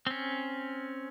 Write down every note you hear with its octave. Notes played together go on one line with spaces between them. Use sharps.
C4 C#4